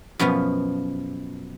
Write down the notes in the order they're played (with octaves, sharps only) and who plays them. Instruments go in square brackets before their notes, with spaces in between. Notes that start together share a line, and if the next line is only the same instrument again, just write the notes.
[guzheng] F#2 B2 F3 B3